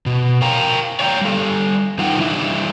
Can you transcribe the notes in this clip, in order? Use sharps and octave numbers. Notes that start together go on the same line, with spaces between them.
B2
A#4 F5 G5 A#5
C#5 D5 F5 G5 G#5 A#5
G3 A4
E3 D#4 F4 F#5 G5
G3 D4 E4 E5